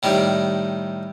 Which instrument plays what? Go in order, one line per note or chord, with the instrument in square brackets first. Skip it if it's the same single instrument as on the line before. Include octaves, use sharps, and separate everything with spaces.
[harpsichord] A2 D#3 G3